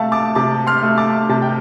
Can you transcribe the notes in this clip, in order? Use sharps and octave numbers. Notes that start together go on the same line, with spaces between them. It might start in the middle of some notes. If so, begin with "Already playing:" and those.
Already playing: C3 A3 F5 A5
A5 D6
C3 A5 D6
C6 F6
A3
A5 D6
C3 A5
G5